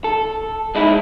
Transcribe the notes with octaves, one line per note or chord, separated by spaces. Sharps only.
A4
G#3 D#4 E4